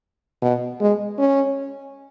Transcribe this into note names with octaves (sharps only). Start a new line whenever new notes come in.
B2
G#3
C#4